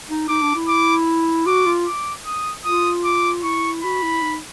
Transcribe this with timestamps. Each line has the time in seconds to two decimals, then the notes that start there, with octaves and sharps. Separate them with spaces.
0.08 D#4
0.28 D#4 D6
0.42 D4
0.55 E4
0.68 D6
1.46 F#4 D6
1.66 F4
1.86 D6
2.26 D#6
2.65 F4 D#6
3.04 D6
3.43 E4 C#6
3.83 F#4 B5
4.02 E4
4.22 D#4